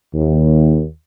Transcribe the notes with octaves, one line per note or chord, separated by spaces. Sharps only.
D#2